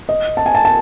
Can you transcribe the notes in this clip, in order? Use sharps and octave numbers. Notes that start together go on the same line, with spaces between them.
D#5
A5
G#5
A5
A5